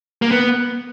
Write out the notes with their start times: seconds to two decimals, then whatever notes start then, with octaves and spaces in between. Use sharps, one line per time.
0.22 A#3
0.31 B3